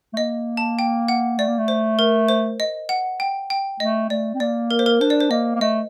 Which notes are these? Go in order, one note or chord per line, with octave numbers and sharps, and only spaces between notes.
A3
A#3 D#5
A5
G5
F#5
A3 D5
A#3
A3
C5
A#4
C5
D#5
F#5
G5
G5
A3 D#5
A3 D5
C4
A#3 D5
A#4
C5
A#4
D4 C5
D5
C5
A#3 D#5
A#3
A3 D#5